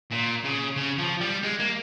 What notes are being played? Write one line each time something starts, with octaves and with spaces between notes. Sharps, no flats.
A#2
C#3
C#3
F3
G3
G#3
A#3